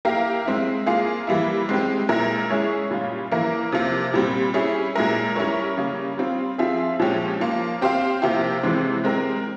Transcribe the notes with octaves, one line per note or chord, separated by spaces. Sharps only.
A#3 E4 G4 A#4 F5
G#3 C4 E4
A#3 F4 G#4
E3 G3 A#3 E4
G#3 C4 G4
A#2 G#3 E4 A#4
G#3 C#4 E4 G#4 C#5
A#2 G3 C#4 F4
E3 A#3 E4 A#4
C3 F3 A#3
A#2 G3 C4
G3 C#4 E4 G#4
A#2 G#3 E4 A#4
G3 C#4 E4 A#4 C#5
C#3 G3 A#3 C#4
G3 C4 F4
F3 C4 F4 G#4 E5
A#2 F3 G#3 C#4 G4
F3 A#3 F4
C4 G4 C5 F5
C3 F3 A#3 E4 G4
C3 E3 G#3 C4
G#3 C4 G4 A#4